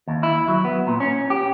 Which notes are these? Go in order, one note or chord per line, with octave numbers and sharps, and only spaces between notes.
D#2
E4
F#3
B3
A#2
C#4
G4